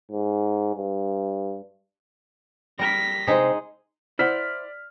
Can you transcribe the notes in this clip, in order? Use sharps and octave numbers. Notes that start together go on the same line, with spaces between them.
G#2
G2
G3 A#4 A#6 B6
C3 G#3 D#4 G#4 C5
E4 C5 D5 F#5 F6 B6